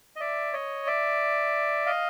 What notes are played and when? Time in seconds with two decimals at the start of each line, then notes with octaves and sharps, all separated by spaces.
0.16 D#5
0.20 D5 E5
0.53 C#5 D#5
0.87 D5 E5
1.86 D#5 F5